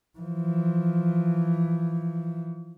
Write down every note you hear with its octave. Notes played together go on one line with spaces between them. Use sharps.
E3 F3